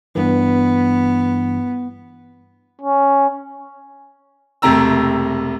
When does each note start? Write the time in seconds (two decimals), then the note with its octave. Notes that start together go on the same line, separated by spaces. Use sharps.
0.15 G2 E3 B3
2.82 C#4
4.62 E1 C3 A3 C4 A#5 E6